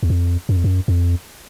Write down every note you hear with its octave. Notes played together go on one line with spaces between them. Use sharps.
E2
F2
F#2
F2
F#2
F2